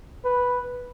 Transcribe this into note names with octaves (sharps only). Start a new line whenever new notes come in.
B4